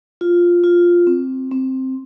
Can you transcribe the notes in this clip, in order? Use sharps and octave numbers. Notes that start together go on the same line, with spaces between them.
F4
F4
C4
C4